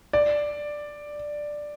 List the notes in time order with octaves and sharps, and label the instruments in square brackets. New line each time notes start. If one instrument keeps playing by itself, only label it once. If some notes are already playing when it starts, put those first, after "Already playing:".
[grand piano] D5